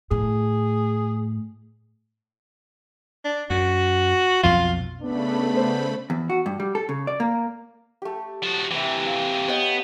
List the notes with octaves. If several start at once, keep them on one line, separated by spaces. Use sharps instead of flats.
A2 G#4
D4
F#2 F#4
B1 F2 F3 F4
C#3 A3 B3 D4 B5
C5
E2
F#4
G2
G3
A4
C#3
D5
A#3
A3 G4
F3 F#4
C3 E3 G4 E5
F5
B3 C#5 D#5 G5